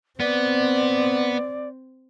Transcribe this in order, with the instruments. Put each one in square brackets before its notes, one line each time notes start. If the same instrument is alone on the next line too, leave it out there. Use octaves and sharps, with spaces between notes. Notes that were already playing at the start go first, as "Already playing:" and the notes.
[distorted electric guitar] B3 [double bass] C4 [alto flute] D5